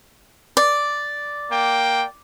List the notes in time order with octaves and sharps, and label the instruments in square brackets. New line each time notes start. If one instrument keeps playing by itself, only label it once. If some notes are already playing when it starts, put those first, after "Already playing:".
[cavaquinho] D5
[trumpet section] A#3 G5